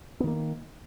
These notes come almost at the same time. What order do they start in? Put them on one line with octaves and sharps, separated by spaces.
B3 D#3 A#3